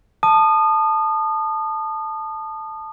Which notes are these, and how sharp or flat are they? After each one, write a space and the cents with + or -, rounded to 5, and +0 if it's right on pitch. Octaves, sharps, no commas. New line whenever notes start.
A5 +0 D#6 -30